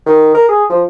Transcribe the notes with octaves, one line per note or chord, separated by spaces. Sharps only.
D#3
A#4
G#4
F3